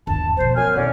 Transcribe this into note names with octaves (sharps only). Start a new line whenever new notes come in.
G1 D#2 A5
B2 F3 C5
F#2 G#5 F6
D#2 A2 F#3 C#4 D5